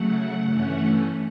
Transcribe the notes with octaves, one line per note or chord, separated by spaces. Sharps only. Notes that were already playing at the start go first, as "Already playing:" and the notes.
Already playing: C#3 F#3 A3 F#5
G2 E3 A3 C#4